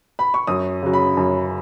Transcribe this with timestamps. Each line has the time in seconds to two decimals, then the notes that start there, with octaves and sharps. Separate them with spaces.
0.19 B5
0.34 C#6
0.47 F#2 D#6
0.83 C#3 F#3
0.93 B5
1.17 F#2